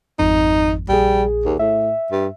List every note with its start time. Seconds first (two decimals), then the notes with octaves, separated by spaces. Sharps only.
0.19 G#1 F2 D#4
0.89 A#1 G3 G#4
1.45 D#2
1.59 A2 E5
2.12 G2